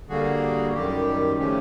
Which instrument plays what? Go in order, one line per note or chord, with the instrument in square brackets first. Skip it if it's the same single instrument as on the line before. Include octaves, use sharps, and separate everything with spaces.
[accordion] D3 G3 A#3 F#4 G#4
F#2 D#3 G3 G4
C#3 F3 A3 C#4 G4